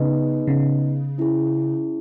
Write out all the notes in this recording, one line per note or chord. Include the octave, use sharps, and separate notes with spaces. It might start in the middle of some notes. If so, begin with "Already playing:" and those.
Already playing: C#3 B3 D#4 G#4 B4 D#5
C#3
C#4 E4 G#4